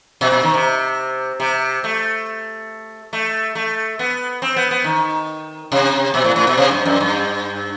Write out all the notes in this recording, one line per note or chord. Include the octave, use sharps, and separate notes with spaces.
B2
B2
D#3
C3
C3
A3
A3
A3
B3
C4
B3
B3
D#3
C3
B2
A2
A2
B2
C3
G2
F#2
G2